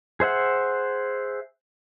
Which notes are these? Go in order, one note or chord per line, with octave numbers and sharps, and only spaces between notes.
G#4 C5 E5 F#5